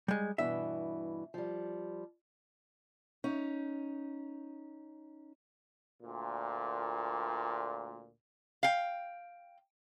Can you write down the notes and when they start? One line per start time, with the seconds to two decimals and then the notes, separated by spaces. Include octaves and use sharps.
0.08 G3 G#3
0.38 G2 B2 E3 E5
1.34 F3 G3
3.24 C#4 D#4
6.02 D2 A#2
8.63 F5 G5